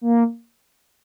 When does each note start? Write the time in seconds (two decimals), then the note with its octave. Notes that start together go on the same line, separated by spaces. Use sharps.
0.01 A#3